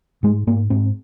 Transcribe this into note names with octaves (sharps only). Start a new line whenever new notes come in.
G#2 G#3
G#2 A#3
G#2 C4